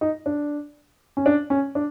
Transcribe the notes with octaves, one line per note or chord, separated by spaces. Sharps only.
D#4
D4
C#4
D4
C#4
D4